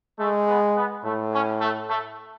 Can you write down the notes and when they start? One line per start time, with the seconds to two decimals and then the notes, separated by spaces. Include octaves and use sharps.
0.19 G#3 A3
0.48 B3
0.76 B3
1.04 A2 A3
1.33 C#4
1.61 A3
1.90 A3